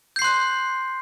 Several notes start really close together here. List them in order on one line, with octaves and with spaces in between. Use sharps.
G6 C7 C6 F#6